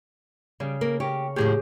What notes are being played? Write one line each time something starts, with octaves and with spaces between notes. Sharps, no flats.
C#3 G3
A#3 A#4
G4 A#4 C#5
D#2 A2 F3 G4 G#4